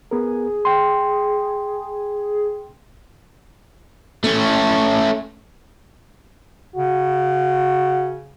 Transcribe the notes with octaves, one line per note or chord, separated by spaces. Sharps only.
B3 G#4 A#4
G5 C6
A3 C#4
C#3 F#4